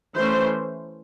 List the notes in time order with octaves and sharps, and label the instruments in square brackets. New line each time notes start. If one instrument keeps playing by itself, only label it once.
[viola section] E3 A3 C#4 C5